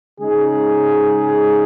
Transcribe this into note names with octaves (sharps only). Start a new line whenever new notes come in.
C#3 G#3 D#4 G#4